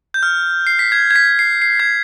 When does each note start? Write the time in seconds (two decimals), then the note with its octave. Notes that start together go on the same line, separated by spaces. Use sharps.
0.14 G6
0.23 F6
0.67 C7
0.79 B6
0.92 G#6
1.11 G#6
1.16 B6
1.39 C7
1.62 C7
1.80 G#6